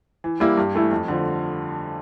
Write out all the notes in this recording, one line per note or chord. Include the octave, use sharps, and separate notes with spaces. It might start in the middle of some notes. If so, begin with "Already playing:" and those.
E3
G3 A#3 E4
G2
E3 A3 E4
F2
D3 F3